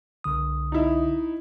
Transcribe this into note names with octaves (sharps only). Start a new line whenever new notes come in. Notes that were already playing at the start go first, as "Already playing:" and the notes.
C2 D3 D#6
D#4 E4